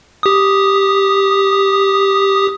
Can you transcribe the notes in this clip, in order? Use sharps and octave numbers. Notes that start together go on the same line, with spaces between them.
G4 D#6